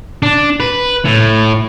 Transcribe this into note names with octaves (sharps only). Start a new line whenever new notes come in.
D4
B4
A2